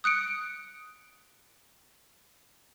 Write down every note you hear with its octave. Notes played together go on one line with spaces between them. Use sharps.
D#6 F#6 C#7 D7